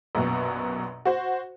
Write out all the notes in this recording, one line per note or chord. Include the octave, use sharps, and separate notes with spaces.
A#1 F#2 B2
F#4 C5